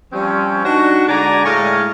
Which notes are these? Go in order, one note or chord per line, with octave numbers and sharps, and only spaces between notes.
F3 G3 C4 C#4
D4 D#4 F#4
D3 G#3 D5 G#5 A#5
A2 G#3 C#5 D#5 F5